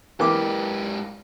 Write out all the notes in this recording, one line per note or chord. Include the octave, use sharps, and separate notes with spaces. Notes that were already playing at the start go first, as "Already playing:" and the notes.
G#2 E3 A#3 G4 D6